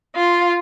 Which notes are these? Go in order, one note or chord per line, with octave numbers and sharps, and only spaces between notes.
F4